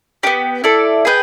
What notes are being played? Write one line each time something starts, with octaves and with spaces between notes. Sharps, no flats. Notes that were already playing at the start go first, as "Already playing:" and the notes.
B3 D4 G4
E4 A4 D5
G#4 B4 D#5 G5